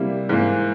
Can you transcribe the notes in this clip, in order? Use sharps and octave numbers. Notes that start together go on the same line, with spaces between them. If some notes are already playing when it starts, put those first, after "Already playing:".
Already playing: C3 G3 A#3 E4
G#2 E3 A#3